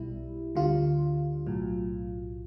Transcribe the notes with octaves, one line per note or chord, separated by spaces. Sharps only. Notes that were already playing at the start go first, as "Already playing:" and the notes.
Already playing: B1 B2 G3 E4
D2 D3 G3 F4
B1 A2 F#3